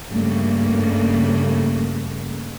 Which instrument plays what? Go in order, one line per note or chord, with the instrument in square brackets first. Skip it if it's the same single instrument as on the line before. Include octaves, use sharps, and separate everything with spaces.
[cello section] G2 C#3 A3 A#3